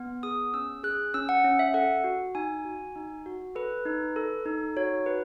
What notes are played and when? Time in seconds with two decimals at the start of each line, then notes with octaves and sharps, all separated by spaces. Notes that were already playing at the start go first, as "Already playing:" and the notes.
Already playing: B3
0.23 G#4 D#6
0.54 C#4 E6
0.83 G#4 F#6
1.14 C#4 E6
1.29 F#5
1.44 C#4
1.59 E5
1.74 A4 F#5
2.04 F#4
2.35 D#4 G#5
2.65 F#4
2.96 D#4
3.26 F#4
3.55 A4 B4
3.85 D#4
4.16 A4
4.46 D#4
4.77 F#4 C#5
5.06 F#4 B4